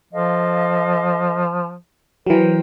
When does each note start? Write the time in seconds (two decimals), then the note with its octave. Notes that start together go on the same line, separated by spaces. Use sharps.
0.13 F3 A4 D#5 F5
2.26 E3 F#3 A#4 C5 G5